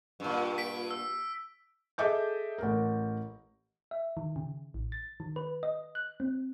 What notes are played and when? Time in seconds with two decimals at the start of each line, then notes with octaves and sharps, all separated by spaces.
0.20 G2 A#2
0.58 B6 D7
0.91 E6
1.98 G#4 A4 D#5 E5 D6 G6
2.58 A1 A#4
3.91 E5
4.17 D#3
4.36 C#3
4.74 A1
4.92 A6
5.20 D#3
5.36 B4
5.63 D#5
5.95 F#6
6.20 C4